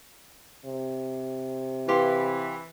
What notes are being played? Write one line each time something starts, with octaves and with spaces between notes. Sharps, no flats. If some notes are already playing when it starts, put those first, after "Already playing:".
C3
E3 G4 F5 C6